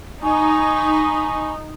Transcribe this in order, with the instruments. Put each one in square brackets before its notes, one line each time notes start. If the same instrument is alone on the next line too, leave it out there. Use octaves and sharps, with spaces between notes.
[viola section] D#4 [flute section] G#5 B5 C#6